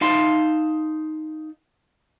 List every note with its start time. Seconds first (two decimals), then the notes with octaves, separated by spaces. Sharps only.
0.01 D#4 F5 A5 C6